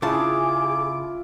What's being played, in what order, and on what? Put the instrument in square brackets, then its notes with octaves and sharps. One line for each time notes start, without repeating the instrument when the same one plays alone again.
[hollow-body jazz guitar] C#3 A5 [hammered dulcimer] E4 F4 [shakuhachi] G#4 [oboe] D6